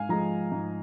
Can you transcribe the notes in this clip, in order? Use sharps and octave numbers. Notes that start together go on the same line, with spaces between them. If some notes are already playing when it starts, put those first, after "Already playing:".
Already playing: G#2 F5 G#5
F3 G#3 A#5
G#2